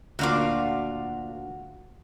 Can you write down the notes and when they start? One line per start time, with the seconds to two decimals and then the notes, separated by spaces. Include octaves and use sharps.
0.19 D2 A#2 A#3 D4 F4 F#4 F5 D6